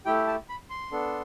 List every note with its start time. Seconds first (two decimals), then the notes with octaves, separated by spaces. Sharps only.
0.06 A3 E4 G4 G5
0.27 A5
0.49 B5
0.70 C6
0.91 B3 D4 A4